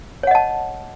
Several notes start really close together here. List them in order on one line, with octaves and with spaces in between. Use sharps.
C#5 F#5 D#5 A5